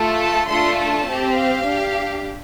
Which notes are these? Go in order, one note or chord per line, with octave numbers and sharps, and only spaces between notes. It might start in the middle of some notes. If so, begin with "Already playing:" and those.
Already playing: A3 F4 A4
A5
A3 D4 F4 A4 C6
A5
C4 G4
F5
D4 G4